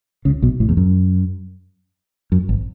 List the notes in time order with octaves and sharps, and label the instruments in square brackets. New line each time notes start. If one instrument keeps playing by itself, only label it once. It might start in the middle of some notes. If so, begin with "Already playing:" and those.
[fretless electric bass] C#2 C#3
B1 B2
A1 A2
E2
F#2
F#2
G#1